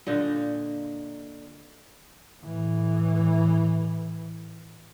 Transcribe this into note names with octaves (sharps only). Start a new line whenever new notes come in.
A#2 D3 D#4
A2 E3